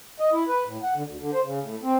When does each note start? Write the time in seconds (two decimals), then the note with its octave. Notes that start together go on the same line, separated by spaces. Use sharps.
0.20 D#5
0.33 E4
0.49 B4
0.66 A2
0.83 F#5
0.95 D3
1.07 D2
1.20 D3
1.33 C5
1.44 C#3
1.61 A2
1.83 C4